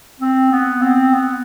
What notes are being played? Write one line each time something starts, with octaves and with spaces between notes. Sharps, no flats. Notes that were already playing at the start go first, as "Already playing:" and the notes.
C4
B3
C4
B3